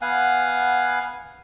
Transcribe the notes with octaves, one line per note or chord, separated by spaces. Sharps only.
B3 F5 F#5 G#5